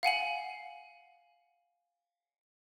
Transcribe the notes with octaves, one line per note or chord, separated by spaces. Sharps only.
F5 F#5 G#5 F#7